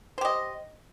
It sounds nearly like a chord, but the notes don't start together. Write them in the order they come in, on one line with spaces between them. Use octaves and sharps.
C5 G4 D#5